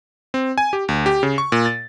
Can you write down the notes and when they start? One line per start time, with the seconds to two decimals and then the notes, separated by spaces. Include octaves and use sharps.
0.34 C4
0.58 G#5
0.73 G4
0.89 D2
1.06 G4
1.23 C#3
1.38 C#6
1.52 A#2
1.66 A6